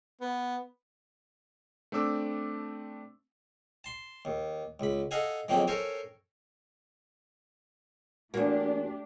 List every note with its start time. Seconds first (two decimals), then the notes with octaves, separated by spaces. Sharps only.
0.21 B3
1.92 A3 C4 D4 D6 E6
3.84 A5 C6
4.25 D#2
4.80 C#2 B5
5.11 A4 D#5 F5 F#5 G#5
5.48 F2 D#3 F#3 A#3 C4 G#4
5.67 A4 A#4 C5 C#5 G#5
8.34 E2 A3 A#3 D4 F#4 G4 D5